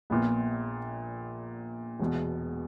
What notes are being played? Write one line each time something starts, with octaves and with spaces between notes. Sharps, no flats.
A#1 A#2 B3
E1 E2 B2